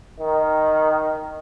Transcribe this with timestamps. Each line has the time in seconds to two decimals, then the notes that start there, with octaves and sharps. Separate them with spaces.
0.20 D#3